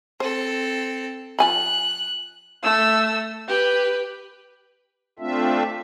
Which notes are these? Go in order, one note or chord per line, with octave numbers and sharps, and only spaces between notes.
C4 A4 C5
F3 G#5 B5 F#6
A3 E6
G4 B4
A3 C4 D4 F4 E5